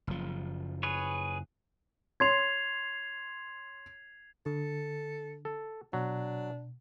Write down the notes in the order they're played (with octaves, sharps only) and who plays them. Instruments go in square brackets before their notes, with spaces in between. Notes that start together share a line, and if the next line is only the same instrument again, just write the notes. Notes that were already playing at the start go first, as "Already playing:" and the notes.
[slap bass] F#1 F3
[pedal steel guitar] G#4 B4 C#5
[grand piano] C#5 C6 [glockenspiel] G#6 C7 F7
[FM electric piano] D3 [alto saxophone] A4
[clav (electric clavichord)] A4
[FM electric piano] B2 [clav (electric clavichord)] F#3 [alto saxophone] D4